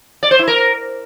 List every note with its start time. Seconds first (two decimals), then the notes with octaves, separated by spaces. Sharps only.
0.23 D5
0.31 C5
0.39 E4
0.47 A#4